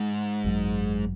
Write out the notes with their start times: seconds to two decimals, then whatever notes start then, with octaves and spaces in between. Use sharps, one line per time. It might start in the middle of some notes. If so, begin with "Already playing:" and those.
Already playing: G#2
0.44 G#1 F#2 D#3 F#3